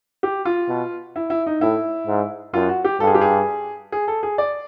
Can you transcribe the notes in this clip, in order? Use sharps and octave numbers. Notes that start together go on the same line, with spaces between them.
G4
F4
B2
E4
E4
D#4
A2 E4
G#2
F#2 F4
F#4
G4
G2 A4
G#4
G4
G#4
G#4
A4
G#4
D5